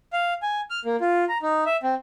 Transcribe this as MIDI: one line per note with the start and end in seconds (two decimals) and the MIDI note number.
0.13 0.34 77
0.42 0.61 80
0.70 0.80 89
0.85 0.96 58
1.01 1.25 65
1.29 1.38 82
1.42 1.64 63
1.66 1.77 76
1.83 1.95 60